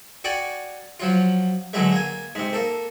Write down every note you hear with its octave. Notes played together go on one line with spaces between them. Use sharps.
F#4 D5 G5 G#5
F3 F#3 F4
D3 E3 F#3 G#3 A3
A#3 G#5
G#2 C3
A#3 A4